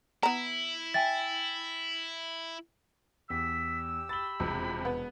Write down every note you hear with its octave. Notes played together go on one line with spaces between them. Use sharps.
B3 E4 A#5
E5 G5 G#5 A6
E2 G4 E6 B6
B5 A6 G7
E1 F2 C3
B3